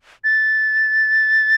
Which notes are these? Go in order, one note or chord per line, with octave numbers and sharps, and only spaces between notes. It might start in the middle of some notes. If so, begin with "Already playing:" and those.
A6